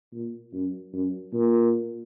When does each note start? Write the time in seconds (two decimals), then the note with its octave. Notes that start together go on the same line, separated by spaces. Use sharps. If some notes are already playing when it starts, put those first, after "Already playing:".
0.13 A#2
0.53 F#2
0.93 F#2
1.33 A#2